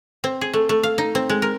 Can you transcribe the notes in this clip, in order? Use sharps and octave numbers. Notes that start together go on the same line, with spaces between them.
C4
G#4
A3
A3
F5
D#4
C4
G#3
A#4